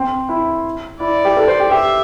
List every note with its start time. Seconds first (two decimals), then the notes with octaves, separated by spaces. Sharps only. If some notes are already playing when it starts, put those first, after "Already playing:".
Already playing: C4
0.29 E4
1.00 E4 D5
1.25 G4
1.37 A4
1.48 C5
1.60 G4
1.71 G4 E5